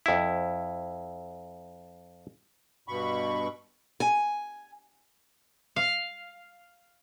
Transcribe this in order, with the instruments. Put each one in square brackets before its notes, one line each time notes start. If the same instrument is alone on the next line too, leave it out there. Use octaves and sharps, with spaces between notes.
[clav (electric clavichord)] F2 E4
[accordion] G2 B2 B5 C#6
[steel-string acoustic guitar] G#5
[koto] F5